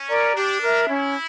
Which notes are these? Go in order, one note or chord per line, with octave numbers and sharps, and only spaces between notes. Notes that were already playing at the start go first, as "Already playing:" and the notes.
Already playing: C#4
A#4 D5 A#5
D4 G4
A#4 E5
C#4 E4